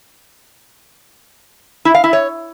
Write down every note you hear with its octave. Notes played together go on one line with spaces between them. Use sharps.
E4
F5
E4
C#5